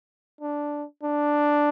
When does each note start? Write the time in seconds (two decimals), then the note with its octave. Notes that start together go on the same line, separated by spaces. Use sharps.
0.41 D4
1.03 D4